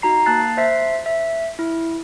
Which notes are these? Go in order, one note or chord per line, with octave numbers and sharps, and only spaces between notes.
D#4 F#4 A#5 C7
A#3 A5 F#6 A6 C7
C5 E5 C7
E5
E4